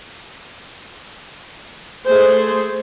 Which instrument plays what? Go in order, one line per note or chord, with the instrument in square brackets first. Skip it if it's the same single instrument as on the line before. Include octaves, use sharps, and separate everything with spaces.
[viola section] A3 G#4 C5